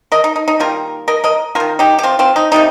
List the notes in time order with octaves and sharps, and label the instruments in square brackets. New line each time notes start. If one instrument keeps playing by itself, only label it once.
[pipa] A#4 D#5
D#4
D#4
D#4
D#3 G3 A#3 F4 A#4
A#4 D#5
A#4 D#5
A#3 F4 A#4
D#3
D#4 G4
G4
C4 F4
C4 F4
D#4
C3 G3 A#3 D#4